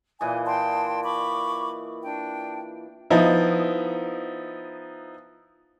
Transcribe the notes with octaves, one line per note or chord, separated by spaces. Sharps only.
A#2 E3 D#5 G#5
G5 A5 C6
B5 C#6 D6
D4 G5
F3 B3 D#4 E4